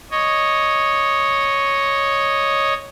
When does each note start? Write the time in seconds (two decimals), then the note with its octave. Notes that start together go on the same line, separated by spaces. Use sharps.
0.11 C#5 D#5